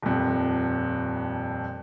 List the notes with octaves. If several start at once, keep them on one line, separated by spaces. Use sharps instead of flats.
D#1 F2